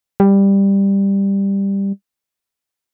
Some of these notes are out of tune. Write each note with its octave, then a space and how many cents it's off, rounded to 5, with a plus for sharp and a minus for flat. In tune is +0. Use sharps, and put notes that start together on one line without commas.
G3 +10